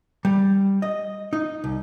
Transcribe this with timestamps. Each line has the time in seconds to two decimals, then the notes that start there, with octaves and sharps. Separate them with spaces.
0.25 G3
0.82 D#5
1.33 D#4
1.64 C2